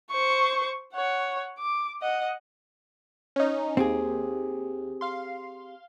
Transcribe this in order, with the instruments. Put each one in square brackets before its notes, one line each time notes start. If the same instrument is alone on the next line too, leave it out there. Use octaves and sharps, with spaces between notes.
[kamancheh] C5 C#6
C#5 F#5
D6
D#5 F#5
[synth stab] C#4 D#4
[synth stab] D#2 [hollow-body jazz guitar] C4 G4 G#4
[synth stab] F5 C6